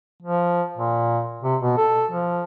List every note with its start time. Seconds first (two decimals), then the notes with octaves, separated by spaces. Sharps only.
0.22 F3
0.77 A#2
1.43 C3
1.61 B2
1.77 A4
2.11 F3